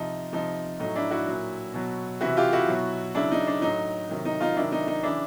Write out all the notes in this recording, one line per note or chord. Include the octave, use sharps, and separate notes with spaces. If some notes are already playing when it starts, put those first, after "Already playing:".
Already playing: C3 F3 D#4
C3 F3 D#4
A2 F#3 D#4
D4 E4
E4 F#4
A#2 F#3
B2 F#3
C3 E3 E4 F#4
F4 G4
E4 F#4
B2 F#3
C#3 F#3 D4 E4
D#4
D4
A2 F#3 D#4
C3 D#3 F#3
D#4
D#4 F4
C3 D#3 F#3 D4 E4
D#4
D#4
C#3 E3 D4 E4